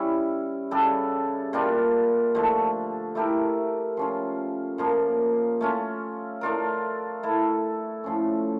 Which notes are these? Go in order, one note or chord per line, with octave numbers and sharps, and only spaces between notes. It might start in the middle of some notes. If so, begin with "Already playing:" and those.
Already playing: G3 C#4 E4
C#3 G3 D4 A4
A#2 G3 D4 F4
D3 F3 A3
A3 E4 G4 A#4
F3 C#4 F4
A#2 F3 A#3
A3 C#4 F4
A3 D4 F4 A#4
A3 E4 A4
A2 F3 C#4